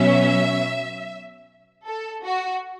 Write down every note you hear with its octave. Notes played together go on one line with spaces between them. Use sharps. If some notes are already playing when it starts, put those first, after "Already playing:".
Already playing: B2 F#3 C#4 E5
A4
F#4